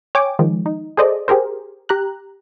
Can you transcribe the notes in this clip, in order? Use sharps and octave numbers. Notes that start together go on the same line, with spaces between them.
C#5 G5 G#5 D6
D#3 F3 G#3
D#4
G#4 A4 C5 D5 D#5
G4 G#4 A#4 C5
G4 A#5 F#6